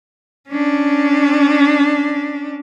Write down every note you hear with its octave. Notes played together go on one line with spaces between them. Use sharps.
C#4 D4